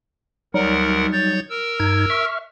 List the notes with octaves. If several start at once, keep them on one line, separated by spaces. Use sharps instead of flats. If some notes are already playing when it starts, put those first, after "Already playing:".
D2 F#3 G3 D#4 A#4 F#5
C#5 G6 A6
A#4 E6
G2 D#4 G#6
E5 C#6 F6